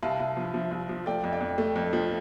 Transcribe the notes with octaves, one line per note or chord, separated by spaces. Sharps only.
C2 F5 A5
C2
F3
F3
C2
F3
A3 D5 G5
F2
D5 G5
F2
A3
F2
F3